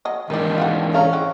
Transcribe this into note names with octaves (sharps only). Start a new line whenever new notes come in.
F#3 D#5
G#2 D#3 E3 D4 B4 D5
F4 G4 F#5
C#4 A4 A#4 F5
G#3 C4 F#5